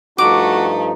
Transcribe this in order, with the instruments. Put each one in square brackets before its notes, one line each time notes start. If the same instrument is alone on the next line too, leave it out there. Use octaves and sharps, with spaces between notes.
[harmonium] G2 F3 D#4 [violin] A3 [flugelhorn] F#4 [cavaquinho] D6